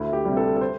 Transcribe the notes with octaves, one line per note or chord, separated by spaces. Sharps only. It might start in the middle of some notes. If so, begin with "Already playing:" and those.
Already playing: D2 E4
G4
C3 G3
A4
A4
C5